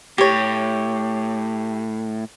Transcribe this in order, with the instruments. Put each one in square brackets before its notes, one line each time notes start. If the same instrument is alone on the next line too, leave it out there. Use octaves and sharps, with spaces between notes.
[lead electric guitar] A2 [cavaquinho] G4 C#5